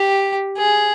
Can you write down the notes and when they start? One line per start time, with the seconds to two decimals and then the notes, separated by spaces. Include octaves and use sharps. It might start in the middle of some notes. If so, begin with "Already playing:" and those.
Already playing: G4
0.57 G#4